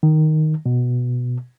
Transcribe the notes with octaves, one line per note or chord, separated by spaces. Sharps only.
D#3
B2